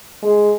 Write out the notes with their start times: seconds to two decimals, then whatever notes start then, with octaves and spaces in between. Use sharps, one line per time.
0.23 G#3